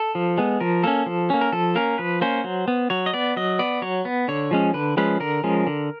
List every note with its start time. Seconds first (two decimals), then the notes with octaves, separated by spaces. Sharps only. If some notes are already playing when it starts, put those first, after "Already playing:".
Already playing: A4
0.15 F3
0.38 G#3 B3
0.60 F3 A#4
0.83 A#3 C#4 A4
1.06 F3
1.30 A#3 C#4
1.41 A#4
1.52 F3 A4
1.75 A#3 C#4 A#4
1.98 F3 B4
2.21 A#3 C#4 C5
2.44 F#3
2.68 B3
2.90 F#3 C#5
3.06 D#5
3.14 B3 D5
3.37 F#3 D#5
3.59 B3 D5
3.82 F#3 C#5
4.05 B3
4.28 D3 C#5
4.51 F3 G#3 C#4
4.74 D3 B4
4.97 F3 G#3 C#4 B4
5.20 D3 A#4
5.44 F3 G#3 C#4
5.67 D3